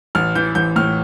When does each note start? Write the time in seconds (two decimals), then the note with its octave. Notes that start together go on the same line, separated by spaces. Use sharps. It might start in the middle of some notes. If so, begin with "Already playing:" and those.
0.15 A1 F6
0.35 E3 G6
0.55 A1 G6
0.76 A2 F6